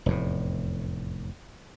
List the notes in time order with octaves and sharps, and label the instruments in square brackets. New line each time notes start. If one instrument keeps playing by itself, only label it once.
[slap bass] F1 E2 A2